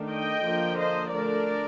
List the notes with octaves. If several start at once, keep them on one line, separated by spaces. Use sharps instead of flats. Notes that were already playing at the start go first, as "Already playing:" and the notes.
Already playing: D#3 A3 D4
D#5 G5
D3 F3 A#3 D4
C5 D#5
D3 A3 D4 A#4 D5